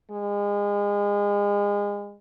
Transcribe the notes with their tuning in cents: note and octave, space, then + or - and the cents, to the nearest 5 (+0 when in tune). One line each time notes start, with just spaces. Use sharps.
G#3 -30